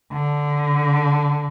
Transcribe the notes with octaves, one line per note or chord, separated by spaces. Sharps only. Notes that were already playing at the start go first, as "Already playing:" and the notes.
D3